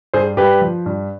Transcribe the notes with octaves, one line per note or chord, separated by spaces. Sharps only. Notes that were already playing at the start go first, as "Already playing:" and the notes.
G2 G#4 C5
G2 G4 B4
F3
G2